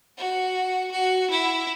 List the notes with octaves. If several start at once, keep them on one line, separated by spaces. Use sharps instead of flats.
F#4
F#4
E4